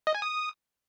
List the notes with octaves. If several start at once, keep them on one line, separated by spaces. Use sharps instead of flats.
D#5
G#5
D#6